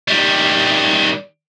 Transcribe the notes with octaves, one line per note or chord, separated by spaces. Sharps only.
D#3 G3